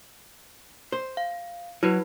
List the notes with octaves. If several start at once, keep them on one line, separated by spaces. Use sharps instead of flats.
C5
F5
F#3 E4 F#4 B4